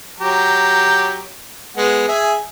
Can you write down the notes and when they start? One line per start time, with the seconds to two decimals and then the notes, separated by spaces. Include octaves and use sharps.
0.20 F#3 G4 A#5
1.77 G#3 B3 F#5
2.08 G#4 E5 G#5